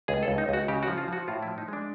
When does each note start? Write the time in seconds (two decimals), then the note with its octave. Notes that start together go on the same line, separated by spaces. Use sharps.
0.08 C#2 G#4
0.23 A4
0.28 C#2
0.38 D#4
0.49 C#2 F#4
0.68 C#3 G4
0.83 F#4
0.88 F3
0.98 F4
1.08 F3 F#4
1.28 A2 F4
1.42 E4
1.47 F3
1.58 D#4
1.68 G#3 D4